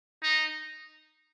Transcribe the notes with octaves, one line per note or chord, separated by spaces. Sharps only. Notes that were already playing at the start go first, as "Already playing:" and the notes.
D#4